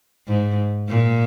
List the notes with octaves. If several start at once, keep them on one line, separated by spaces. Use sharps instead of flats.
G#2
A#2